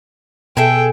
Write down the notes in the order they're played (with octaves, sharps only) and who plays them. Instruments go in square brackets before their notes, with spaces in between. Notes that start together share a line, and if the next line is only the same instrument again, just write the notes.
[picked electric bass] B2 [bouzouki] G#4 A4 E5 [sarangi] G5